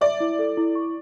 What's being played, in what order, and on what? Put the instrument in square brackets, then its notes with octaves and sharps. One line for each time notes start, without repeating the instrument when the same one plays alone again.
[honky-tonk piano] D5 [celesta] E5
[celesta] E4
A4
E4
C#6